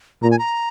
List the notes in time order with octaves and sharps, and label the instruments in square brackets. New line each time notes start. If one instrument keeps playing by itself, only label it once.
[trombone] A#2 [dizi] A#5
[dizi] G#5
A#5